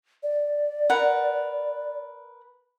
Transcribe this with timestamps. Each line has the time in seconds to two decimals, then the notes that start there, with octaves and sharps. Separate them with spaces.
0.23 D5
0.90 A#4 B4 F#5